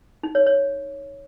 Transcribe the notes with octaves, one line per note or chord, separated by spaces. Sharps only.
D#4
C#5
C#5